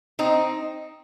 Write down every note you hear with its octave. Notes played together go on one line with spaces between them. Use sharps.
C4 D#4